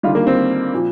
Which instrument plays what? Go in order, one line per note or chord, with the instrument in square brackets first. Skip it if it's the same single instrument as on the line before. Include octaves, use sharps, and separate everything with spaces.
[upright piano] D#2 D3 G3 F4
A#3
C4
A#2 F3